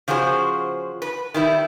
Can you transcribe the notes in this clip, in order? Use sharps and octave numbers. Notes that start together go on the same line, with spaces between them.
C#3 F3 F#4 G#4 C5
B4
D#3 G3 E4